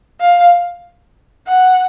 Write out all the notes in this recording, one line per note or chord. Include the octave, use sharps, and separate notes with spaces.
F5
F#5